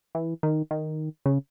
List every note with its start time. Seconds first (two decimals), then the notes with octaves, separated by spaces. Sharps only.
0.15 E3
0.43 D#3
0.71 D#3
1.26 C#3